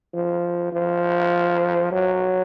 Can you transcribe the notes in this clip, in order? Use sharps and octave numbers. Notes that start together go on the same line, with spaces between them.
F3
F3
F#3